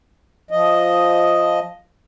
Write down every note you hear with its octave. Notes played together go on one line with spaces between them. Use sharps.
F3 D#5